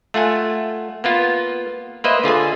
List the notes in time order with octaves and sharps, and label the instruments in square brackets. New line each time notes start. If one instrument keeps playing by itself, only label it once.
[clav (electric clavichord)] A3 F4 F#5 G#5
A#3 B3 F4
A#3 B4 C5 D#5 E5
D3 F4 G#4 G#5